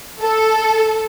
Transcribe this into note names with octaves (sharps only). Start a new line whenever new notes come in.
A4